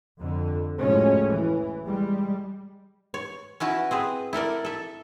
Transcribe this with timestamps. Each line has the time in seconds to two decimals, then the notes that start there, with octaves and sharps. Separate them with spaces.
0.19 F2 D3
0.78 F#1 F#2 A2 F3 G#3 C#4
1.28 E3
1.83 G3 G#3
3.14 C#5
3.60 C#4 E4 F#4 B4
3.91 C4 G#4 B4
4.33 E4 A4 A#4 D5
4.65 A4 E5